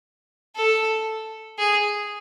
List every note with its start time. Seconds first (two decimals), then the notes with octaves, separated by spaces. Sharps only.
0.56 A4
1.59 G#4